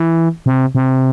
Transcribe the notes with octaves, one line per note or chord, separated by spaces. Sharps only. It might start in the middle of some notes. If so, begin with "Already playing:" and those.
Already playing: E3
C3
C3